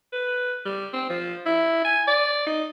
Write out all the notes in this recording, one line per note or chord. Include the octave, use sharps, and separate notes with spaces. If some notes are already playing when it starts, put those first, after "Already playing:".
B4
G3
C4
F3
E4
G#5
D5
D#4